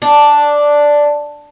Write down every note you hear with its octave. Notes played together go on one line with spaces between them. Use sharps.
D4